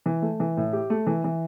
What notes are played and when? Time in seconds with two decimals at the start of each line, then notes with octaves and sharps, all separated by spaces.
0.06 E3
0.22 A3
0.40 E3
0.57 A2
0.73 G4
0.90 A3
1.07 E3
1.24 E3